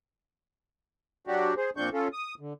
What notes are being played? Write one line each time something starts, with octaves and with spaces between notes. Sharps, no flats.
F#3 D4 F#4 G4
G#4 C5
A#2 F3 C4 D4 C#6 G6
C#4 F4 A4
D#6
D3